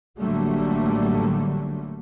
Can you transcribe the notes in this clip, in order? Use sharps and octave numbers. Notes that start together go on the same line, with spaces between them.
A1 D3 F#3 G3 A3 A#3